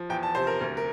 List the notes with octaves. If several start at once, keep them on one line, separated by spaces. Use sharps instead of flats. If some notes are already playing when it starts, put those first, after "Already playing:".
Already playing: F3
E2 G5
A5
C3 C5
A#4
D2 A#4
A#4